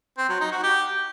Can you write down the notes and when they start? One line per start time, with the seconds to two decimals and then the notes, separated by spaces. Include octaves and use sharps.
0.18 C4
0.29 F#3
0.41 D#4
0.52 F#4
0.63 G4